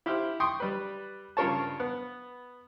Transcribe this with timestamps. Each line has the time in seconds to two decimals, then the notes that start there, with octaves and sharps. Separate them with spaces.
0.06 E4 G4 C5 F6
0.40 G5 C6 C#6 D#6
0.60 G3 B4
1.37 G2 C#3 F4 A#4 C#5 A5
1.80 B3